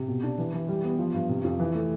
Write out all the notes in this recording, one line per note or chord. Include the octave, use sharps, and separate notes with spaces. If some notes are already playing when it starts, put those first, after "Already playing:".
Already playing: C3
B2
D4
E3
E3
G3
B3
F3
G2
C3
F2
E3
A3